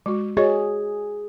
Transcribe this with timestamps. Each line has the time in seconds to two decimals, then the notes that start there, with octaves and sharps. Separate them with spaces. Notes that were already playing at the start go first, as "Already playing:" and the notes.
0.06 G#3 F#4
0.37 F#4 G#4 C#5 D#5